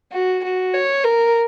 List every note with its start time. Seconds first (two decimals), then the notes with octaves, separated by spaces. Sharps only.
0.12 F#4
0.44 F#4
0.74 C#5
1.05 A#4